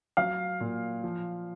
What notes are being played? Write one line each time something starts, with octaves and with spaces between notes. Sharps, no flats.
F#3 F5
A#2
F3